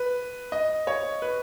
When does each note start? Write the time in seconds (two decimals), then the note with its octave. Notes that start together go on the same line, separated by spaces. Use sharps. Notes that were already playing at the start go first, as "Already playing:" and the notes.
Already playing: B4
0.52 D#5
0.87 C#5
1.22 B4